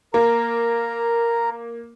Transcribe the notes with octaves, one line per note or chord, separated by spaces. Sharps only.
A#3 A#4 A#5